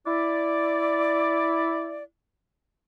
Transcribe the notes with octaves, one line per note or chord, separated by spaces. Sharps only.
E4 D5